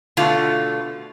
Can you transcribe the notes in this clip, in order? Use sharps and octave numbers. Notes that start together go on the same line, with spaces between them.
B2 D3 A3 F4